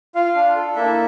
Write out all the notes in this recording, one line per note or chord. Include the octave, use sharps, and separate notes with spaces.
F4 F5
D4
A4
A#3 E4 E5